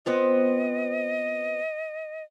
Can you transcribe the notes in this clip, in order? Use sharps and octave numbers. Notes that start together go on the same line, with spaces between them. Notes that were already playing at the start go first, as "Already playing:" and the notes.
B3 C4 F4 D#5